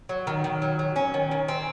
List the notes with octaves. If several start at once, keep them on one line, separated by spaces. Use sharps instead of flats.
F#3
D#3
D#3
F#3
F#3
C#4
D#3
D#3
C4